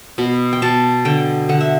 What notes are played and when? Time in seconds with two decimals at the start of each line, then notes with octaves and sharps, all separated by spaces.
0.18 B2 B5
0.53 G5
0.62 B2 A5
1.05 D3 G5
1.49 D3 F#5
1.61 E5